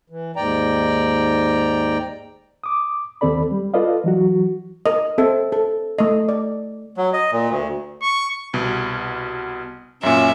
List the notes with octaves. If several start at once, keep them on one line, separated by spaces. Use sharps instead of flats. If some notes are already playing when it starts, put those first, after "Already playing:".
E3
D#2 G#2 D5 G5 A#5
D6 D#6
D#2 D#3 C4 A4 D5 B5
G3
F4 A4 B4 D5 D#5 F5
E3 F#3 F#4
A#4 D#5
C4 A4 E5
A4
A3 D#5
D5
F#3
D#5
A#2
D2
C#6
C2 B2
F#2 A#2 C#4 E5